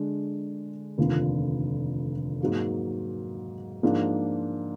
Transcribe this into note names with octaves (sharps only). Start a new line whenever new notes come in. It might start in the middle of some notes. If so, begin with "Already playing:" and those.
Already playing: D3 G#3 D4
F1 D#2 D3 F3
G#2 F#3 A#3
G#2 F3 A#3 D4